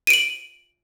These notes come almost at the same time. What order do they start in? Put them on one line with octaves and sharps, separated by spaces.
D#7 D7 F#7